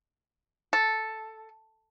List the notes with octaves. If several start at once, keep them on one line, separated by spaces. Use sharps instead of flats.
A4